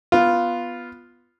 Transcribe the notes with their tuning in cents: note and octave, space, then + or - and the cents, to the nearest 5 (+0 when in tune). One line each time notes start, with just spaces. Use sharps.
B3 +0 F4 +0